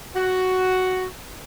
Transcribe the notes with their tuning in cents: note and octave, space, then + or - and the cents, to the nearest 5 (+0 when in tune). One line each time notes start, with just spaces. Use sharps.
F#4 +5